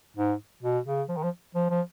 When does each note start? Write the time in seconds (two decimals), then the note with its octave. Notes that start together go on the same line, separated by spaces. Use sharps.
0.17 G#2
0.63 B2
0.86 C#3
1.09 F3
1.17 D#3
1.23 F3
1.55 F3
1.70 F3